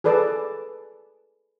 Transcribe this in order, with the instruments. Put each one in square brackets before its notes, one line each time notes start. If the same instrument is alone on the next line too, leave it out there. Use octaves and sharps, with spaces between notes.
[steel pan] G#4 A4 B4 D5 A5